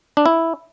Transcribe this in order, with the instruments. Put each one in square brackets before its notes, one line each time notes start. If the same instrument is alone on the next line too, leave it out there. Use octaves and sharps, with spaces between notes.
[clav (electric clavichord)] D4
E4